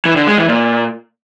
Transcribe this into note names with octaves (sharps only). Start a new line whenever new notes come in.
E3
D3
G#3
E3
A#2